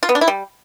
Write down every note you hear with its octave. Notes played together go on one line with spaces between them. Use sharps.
F4
B3
D4
E4
G3